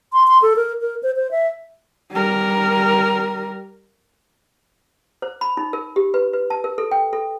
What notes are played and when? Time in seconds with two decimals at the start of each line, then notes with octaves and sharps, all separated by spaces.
0.13 C6
0.27 C6
0.42 A4
0.56 A#4
0.81 A#4
1.03 C5
1.16 C5
1.31 E5
2.12 G3 A#4
5.22 C5
5.41 B5
5.57 D#4
5.73 A#4
5.96 G4
6.14 B4
6.33 B4
6.50 A5
6.64 A#4
6.78 A4
6.91 G5
7.13 A4